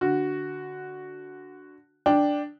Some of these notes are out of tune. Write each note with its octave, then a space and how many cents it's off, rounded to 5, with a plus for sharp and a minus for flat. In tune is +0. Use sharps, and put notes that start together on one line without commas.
D3 +0 F#4 +0
D4 +0 G5 +0